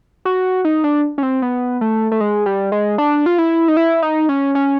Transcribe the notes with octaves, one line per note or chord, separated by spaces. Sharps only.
F#4
D#4
D4
C#4
C4
B3
A3
A3
G#3
G3
G#3
D4
F4
E4
D#4
E4
D#4
C#4
C#4